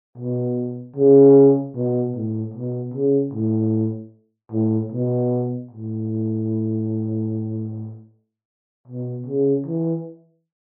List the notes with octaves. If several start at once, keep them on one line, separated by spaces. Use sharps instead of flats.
B2
C#3
B2
A2
B2
C#3
A2
A2
B2
A2
B2
C#3
E3